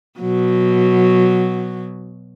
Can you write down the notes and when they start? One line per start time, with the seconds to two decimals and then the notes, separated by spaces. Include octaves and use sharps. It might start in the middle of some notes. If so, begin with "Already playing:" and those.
0.20 B2 F#3